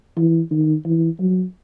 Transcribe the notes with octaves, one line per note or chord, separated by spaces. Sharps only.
E3
D#3
E3
F#3